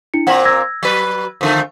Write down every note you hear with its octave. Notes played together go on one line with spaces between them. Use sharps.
D4 E4 C#7
A#2 C4 A#4 F#5 F#7
E6 G#6 A#6
F#3 B4
F2 D3 A3